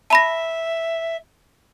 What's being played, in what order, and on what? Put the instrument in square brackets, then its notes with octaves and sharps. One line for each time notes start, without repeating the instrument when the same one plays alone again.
[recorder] E5 [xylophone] A5 B5 A#6